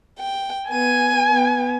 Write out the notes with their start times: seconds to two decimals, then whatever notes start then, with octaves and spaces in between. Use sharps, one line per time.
0.18 G5
0.70 B3 G#5 D#7
1.29 B3